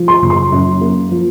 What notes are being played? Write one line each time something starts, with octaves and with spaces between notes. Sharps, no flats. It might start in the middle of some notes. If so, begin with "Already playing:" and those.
Already playing: F3
C6
F#1
C6
F#2
A#3
F3